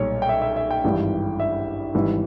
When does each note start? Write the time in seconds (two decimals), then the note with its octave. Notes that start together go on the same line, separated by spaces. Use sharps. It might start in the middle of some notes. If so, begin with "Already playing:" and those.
Already playing: B1 A#2 G3 C#5
0.22 G5
0.29 E5
0.42 E5
0.56 E5
0.71 G5
0.84 G#1 G2 E3 G3
1.40 E5
1.94 G#1 G#2 E3 G3